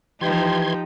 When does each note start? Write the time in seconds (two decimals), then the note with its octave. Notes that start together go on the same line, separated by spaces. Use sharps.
0.21 E3 F3 D#4 G4 C6 G#6